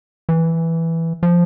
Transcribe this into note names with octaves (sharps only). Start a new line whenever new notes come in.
E3
F3